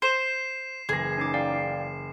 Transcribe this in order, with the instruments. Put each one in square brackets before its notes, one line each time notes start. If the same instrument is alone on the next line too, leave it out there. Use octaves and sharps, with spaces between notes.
[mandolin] C5 [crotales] C7 E7
[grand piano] F#1 E3 A#6 [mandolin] G#4
[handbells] C#4 D#4 D6
D5 F5 G5